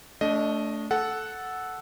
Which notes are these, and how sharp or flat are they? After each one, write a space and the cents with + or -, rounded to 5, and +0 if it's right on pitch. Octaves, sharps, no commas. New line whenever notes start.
A3 +0 D4 -30 D#5 +0
A4 -10 F#5 +0